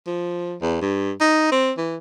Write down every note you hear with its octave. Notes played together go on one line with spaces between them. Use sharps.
F3
E2
G2
D#4
C4
E3